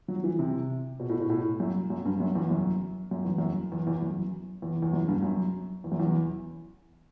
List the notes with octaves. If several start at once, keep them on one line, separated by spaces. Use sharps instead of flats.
F#3
E3
C3
B2
A2
B2
A2
F#2
F#2
G2
F#2
E2
F#2
F#2
E2
F#2
E2
E2
F#2
E2
E2
F#2
G2
F#2
E2
F#2
E2